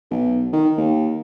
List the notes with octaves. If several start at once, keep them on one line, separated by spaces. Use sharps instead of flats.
B1
D#3
D#2